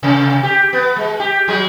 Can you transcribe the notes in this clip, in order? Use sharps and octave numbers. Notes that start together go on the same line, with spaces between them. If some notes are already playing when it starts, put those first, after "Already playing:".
C3 A#3
G4
B3
G#3
G4
F#3 G#3 G#4